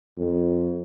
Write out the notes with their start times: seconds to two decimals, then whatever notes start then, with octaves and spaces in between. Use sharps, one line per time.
0.18 F2